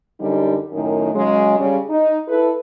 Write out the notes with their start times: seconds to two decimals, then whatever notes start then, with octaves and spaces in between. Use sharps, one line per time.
0.20 F#2 D3 G3 D#4
0.72 F#2 A2 D#3
1.15 C#3 F#3 G#3
1.58 C#3 G3
1.90 D#4
2.28 E4 A4 B4